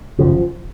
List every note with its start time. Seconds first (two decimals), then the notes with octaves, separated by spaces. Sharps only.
0.19 G#1 F#2 C#3 F3